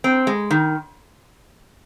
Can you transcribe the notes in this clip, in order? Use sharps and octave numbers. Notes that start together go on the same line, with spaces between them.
C4
G#3
D#3